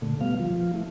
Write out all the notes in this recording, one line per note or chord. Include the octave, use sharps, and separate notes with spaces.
A#2 D3 A3
B2 G3 B3 F5
F3 F4
A3 E4